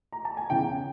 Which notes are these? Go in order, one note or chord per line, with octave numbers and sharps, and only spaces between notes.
A#5
A5
G#5
E2 C#3 E3 G5